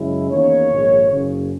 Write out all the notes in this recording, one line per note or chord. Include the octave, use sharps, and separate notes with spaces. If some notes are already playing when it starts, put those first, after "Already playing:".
Already playing: F#2 C#3 G#3 C#4 E4
E2 D#3 A#3 C#4 C#5
A#1 G#2 D#3
F#1 F#2 C#3